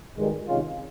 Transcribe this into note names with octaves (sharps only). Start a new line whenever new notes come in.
G#1 G2 D#3 G#3
C3 D#3 G#3 C#4 F4